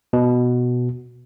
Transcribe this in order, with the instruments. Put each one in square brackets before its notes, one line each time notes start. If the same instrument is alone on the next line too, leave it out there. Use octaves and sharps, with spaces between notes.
[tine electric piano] B2